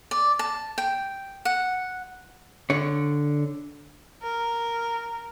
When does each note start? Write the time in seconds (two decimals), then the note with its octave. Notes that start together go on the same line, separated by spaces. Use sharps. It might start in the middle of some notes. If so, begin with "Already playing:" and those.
0.11 D5
0.39 A5
0.78 G5
1.45 F#5
2.70 D3 C#5
4.23 A#4